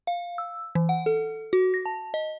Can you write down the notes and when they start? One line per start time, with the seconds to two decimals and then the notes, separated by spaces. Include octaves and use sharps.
0.07 F5
0.38 E6
0.75 E3
0.89 F#5
1.06 A4
1.53 F#4
1.74 A#6
1.86 A5
2.14 D#5